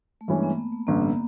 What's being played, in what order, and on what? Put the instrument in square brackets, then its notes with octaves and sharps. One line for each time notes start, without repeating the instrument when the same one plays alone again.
[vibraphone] A3
[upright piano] G2 E3 G#3 C#4 [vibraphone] A#3
[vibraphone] B3
A#3
A3
[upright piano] A1 G2 D3 [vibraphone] A#3
[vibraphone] B3